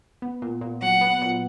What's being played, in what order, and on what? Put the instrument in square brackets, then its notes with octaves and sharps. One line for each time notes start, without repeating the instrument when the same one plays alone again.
[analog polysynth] B3
A#2
A#2
[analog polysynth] F#3 [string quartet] F#5
[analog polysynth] B3
A#2